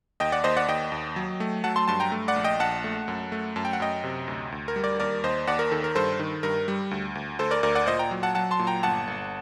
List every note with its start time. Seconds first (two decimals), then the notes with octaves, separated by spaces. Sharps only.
0.20 D#2 D#5 G5
0.32 D5 F#5
0.44 D#2 C5 D#5
0.57 D5 F#5
0.68 D#2 D#5 G5
0.92 D#2
1.16 F#3
1.40 A3
1.64 F#3 F#5 A5
1.76 A5 C6
1.88 G2 A5 C6
2.00 G5 A#5
2.12 A3
2.28 D5 F#5
2.36 A#1
2.44 D#5 G5
2.60 A#1 F#5 A5
2.84 A3
3.08 F#2
3.32 A3
3.56 F#2 A5
3.65 G5
3.73 F#5
3.80 F#2 D#5 G5
4.04 C3
4.28 D2
4.52 D2
4.68 A#4
4.76 G3
4.83 A#4 D5
5.00 D#2 A#4 D5
5.24 D#2 C5 D#5
5.47 D#2 D5 F#5
5.59 A#4
5.71 D#3 A4
5.84 A#4
5.95 G2 A4 C5
6.19 D#3
6.43 G2 A#4
6.68 G3
6.91 D2
7.15 D2
7.39 D2 A4 C5
7.51 A#4 D5
7.63 D2 A#4 D5
7.75 D5 F#5
7.87 A#2 C5 D#5
7.99 G5 A#5
8.11 F#3
8.23 F#5 A5
8.35 F#3 F#5 A5
8.51 A5 C6
8.59 A#2
8.67 G5 A#5
8.83 G1 F#5 A5
9.07 G1